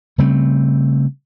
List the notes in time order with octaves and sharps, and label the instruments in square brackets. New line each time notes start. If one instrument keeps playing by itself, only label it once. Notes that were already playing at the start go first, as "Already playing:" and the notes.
[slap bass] C#3 G3 A3 C4